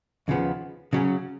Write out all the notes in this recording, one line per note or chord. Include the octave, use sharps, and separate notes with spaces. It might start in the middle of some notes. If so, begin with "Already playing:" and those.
D#2 C#3 F3 B3
C#3 F#3 C#4